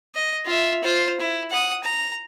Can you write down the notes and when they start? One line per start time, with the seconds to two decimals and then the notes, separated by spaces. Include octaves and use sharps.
0.15 D#5
0.46 F4 E5
0.83 F4 C5
1.20 E4
1.51 F#5 D#6
1.84 A#5